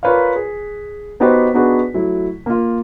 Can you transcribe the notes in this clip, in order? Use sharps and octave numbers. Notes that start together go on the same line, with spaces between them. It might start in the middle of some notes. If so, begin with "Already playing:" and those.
F4 A#4 B4 C#5 D5 F5
G#4
B3 D#4 F#4 G4 B4 C5
B3 D4 D#4 F#4 G#4 B4
F#3 A3 E4
A#3 F4